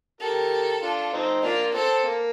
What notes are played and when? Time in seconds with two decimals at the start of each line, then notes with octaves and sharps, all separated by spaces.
0.21 G4 A4 A#4
0.82 D4 F4
1.13 C4 D#4
1.43 A#3 D4 F4
1.74 C4 A4
2.04 A#3